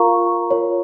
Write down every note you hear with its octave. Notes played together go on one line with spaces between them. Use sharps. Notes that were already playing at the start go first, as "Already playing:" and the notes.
Already playing: F4 A#4 F5 A#5 C#6
F4 A#4 C#5